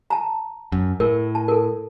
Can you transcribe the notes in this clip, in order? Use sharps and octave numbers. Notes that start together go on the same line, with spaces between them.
A5 A#5
F#2
A2 A#4
A5
A4 A#4